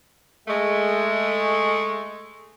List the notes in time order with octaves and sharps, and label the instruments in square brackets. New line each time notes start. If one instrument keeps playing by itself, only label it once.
[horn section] G#3 A3